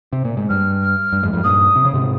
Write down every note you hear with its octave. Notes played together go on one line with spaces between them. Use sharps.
C3
A#2
G#2
G2 F6
F6
G2
F2 G#2
F2 G#2
G2 A#2 D#6
C3
C#3
G#2 C3